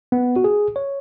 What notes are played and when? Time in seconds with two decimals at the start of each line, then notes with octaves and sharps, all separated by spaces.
0.12 B3
0.36 F#4
0.44 G#4
0.76 C#5